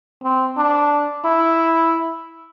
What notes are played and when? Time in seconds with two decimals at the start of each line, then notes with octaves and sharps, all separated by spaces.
0.23 C4
0.57 D4
1.25 E4